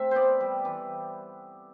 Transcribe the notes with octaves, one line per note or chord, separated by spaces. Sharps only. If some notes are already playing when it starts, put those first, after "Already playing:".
Already playing: C3 A3 E5
B3 C5 D5
G3
E3